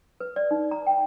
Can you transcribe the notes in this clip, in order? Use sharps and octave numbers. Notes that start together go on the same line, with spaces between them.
B4
D5
D#4
A#5
G5